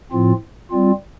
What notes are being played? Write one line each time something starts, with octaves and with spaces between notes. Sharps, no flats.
A2 F3 C4 F4
G3 C4 F4